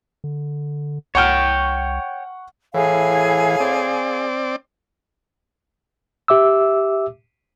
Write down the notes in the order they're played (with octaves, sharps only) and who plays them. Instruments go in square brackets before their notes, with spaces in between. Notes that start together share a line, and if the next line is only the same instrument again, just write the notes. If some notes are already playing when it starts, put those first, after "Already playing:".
[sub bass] D3
[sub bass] C2 [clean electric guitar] C#5 G5 [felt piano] F#5 C#6 F6
[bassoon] A2 [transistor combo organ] E3 [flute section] G#4 F5 G#5
[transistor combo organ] C4 D5
[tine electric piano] G4 E5 D6 E6